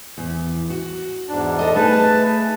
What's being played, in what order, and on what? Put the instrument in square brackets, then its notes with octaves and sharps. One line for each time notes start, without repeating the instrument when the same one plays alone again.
[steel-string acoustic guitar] E2
F#4
[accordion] E2 G#2 D4
[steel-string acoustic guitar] A4 D#5
[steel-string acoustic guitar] A3 D#4 G#4 [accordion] B4 A5